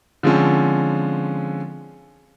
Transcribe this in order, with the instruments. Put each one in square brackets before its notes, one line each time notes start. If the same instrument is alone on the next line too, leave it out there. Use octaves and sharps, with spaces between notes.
[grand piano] D3 F3 G#3 C4 C#4